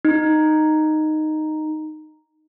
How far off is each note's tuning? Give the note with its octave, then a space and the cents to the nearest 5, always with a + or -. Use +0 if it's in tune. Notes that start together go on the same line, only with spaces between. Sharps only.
D#4 -5